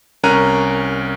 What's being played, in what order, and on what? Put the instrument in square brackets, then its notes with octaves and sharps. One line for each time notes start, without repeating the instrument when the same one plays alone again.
[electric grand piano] C2 C#4 A#4 A#5 F#6 D#7